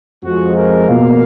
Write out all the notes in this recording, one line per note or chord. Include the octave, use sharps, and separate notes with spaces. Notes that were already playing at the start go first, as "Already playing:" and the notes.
F2 F3 G#3 F#4
A#4
B2 A#3 F5